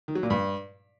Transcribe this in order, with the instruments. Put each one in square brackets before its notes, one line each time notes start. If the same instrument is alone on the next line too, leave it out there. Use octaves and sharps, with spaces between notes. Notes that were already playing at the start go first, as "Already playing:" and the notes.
[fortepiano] D#3
F#3
A#2
G2